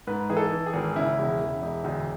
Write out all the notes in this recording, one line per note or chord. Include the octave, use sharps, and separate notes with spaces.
G#2 B4
E3 G#4
A4
E3
G#4
G#1
C#3 E4
E1
E1
E1
D2